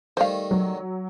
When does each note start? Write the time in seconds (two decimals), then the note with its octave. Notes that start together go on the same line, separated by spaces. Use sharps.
0.17 D#3 G3 A3 C5 F5
0.51 F#3